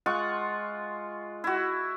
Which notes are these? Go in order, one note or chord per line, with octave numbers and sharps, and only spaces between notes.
G#3 F4 F#5 C#6
E4 F#4